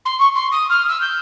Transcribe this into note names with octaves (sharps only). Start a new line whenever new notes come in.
C6
C#6
C6
D#6
F6
E6
G6